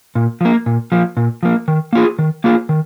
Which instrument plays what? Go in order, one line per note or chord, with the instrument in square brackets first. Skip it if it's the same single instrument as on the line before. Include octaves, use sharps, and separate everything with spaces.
[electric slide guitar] A#2
F3 A#3
A#2
F3 A#3
A#2
F3 A#3
D#3
A#3 F4 G#4
D#3
A#3 F4 G#4
D#3